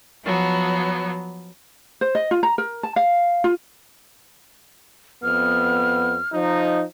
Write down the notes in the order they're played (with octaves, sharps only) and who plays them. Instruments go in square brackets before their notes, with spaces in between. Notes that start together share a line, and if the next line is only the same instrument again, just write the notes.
[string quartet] F3 F#3 B3
[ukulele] C5
D#5
F4
A#5
A#4
A5
F5
F4
[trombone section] F2 B3 [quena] F6
[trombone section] F3 D#4